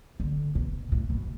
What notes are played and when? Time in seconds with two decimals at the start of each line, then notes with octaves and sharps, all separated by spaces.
0.20 D3
0.55 B2
0.92 A2
1.10 B2